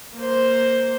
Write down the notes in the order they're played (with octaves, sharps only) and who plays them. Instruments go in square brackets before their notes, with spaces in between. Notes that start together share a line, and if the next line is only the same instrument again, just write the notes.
[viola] A#3 C5